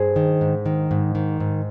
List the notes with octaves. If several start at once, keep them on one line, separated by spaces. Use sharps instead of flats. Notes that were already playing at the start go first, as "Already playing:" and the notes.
Already playing: G2 G#4 C5
D#3
G#2
D#3
G#2
D#3
G#2